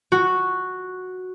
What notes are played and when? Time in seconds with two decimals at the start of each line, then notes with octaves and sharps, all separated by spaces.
0.12 F#4